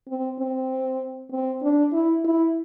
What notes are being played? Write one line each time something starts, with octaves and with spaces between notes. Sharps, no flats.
C4
C4
C4
D4
E4
E4